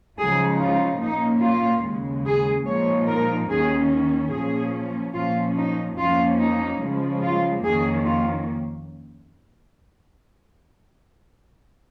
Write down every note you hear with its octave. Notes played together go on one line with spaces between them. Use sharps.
C#3 F3 G#3 D#4 G#4
F4
A#2 A#3 C#4 D#4
F4
D#2 C#3 G#3
G#4
A#2 F3 G#3 D#4 C#5
A#4
D#2 D#3 C#4 G#4
A#2 F3 C#4 G#4
A#2 F3 C#4 F4
D#4
F2 F3 A#3 C#4 F4
D#4
C#3 F3 G#3
F4
F2 D#3 A#3 C#4 G#4
F4